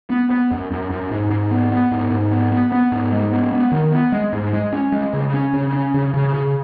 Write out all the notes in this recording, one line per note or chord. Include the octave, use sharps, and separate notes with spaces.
B3
B3
F#2
F#2
F#2
G#2
G#2
B3
B3
G#2
G#2
B3
B3
B3
G#2
G#3
B3
B3
D#3
B3
G#3
G#2
G#3
C#4
G#3
C#3
C#4
C#3
C#4
C#3
C#3
C#3